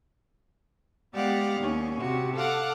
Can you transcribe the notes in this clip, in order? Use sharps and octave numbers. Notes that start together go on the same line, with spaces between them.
G#3 B3 G4 D5 F5 F#5
D#2 C#4
C3 F#4
A4 F5 F#5 D6